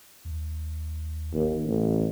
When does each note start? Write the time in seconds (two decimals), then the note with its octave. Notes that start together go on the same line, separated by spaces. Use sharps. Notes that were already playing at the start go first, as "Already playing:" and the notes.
0.25 D#2
1.34 G1 D#2
1.67 A1